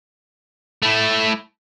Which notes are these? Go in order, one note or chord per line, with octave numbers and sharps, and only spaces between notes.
A3 E4